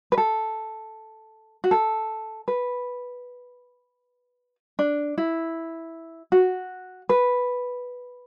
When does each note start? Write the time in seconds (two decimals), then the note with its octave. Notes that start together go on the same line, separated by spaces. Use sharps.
0.12 B4
0.18 A4
1.64 F#4
1.71 A4
2.48 B4
4.79 D4
5.18 E4
6.32 F#4
7.09 B4